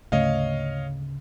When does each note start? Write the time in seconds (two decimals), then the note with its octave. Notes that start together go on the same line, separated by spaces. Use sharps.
0.12 D2 G#2 C#3 A3 C#5 D#5 F5